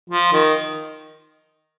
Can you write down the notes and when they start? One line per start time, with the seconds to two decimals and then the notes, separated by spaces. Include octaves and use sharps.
0.09 F3
0.32 D#3